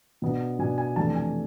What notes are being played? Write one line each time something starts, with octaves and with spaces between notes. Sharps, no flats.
B2 B3 D4
B2 B3 D4 G#5
G#5
F2 C3 E3 A3 D4 A5
G#5